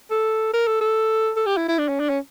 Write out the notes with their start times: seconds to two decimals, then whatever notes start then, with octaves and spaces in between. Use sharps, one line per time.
0.11 A4
0.53 A#4
0.67 A4
0.81 A4
1.36 A4
1.46 G4
1.57 E4
1.68 E4
1.79 D4
1.89 C#4
2.00 D4
2.09 C#4